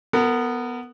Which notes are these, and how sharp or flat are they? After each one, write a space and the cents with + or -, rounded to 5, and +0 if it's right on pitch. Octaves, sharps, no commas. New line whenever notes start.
B3 +0 A#4 -35